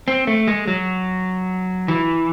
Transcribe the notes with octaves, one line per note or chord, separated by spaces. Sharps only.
C4
A3
G#3
F#3
E3